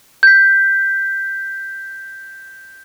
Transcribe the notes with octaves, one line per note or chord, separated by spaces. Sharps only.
G6 B6